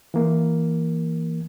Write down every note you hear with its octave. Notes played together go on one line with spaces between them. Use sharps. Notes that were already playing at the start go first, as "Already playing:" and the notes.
E3 A#3